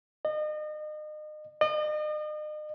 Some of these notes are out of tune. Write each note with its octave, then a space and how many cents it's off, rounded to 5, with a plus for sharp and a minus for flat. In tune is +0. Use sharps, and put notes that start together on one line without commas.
D#5 -35
D#5 -40